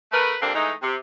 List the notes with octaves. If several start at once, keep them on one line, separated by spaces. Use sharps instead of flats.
A3 A#4 B4
D3 F3 G3 A#3 C4 D4
E3 G#3 A3 D#4
C3